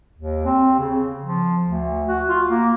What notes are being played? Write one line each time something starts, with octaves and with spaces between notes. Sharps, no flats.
D#2
C4
C#3
F3
D2
F#4
F4
A#3